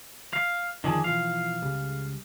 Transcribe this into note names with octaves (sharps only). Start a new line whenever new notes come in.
F5
F2 D3 D#3 F3 D4 G#4
B2 E3 F3 F5
C#2 C#3 G3